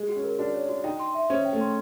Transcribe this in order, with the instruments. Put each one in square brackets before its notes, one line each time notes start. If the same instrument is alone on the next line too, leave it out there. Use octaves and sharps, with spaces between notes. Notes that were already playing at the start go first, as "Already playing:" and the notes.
Already playing: [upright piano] G#3
[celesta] F#4
[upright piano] C#4
[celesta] A#4
[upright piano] D4 [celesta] F#4
[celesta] C#5
F#4
[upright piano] D#4 [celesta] G5
[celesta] C6
E5
[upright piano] C#4 [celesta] C5
[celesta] G5
[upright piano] A3
[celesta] C6